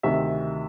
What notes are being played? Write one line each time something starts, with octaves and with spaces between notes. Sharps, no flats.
D2 C3 D#3 E5